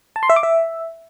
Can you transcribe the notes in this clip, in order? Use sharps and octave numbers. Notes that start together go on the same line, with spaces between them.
A5
C6
E5
D6
E5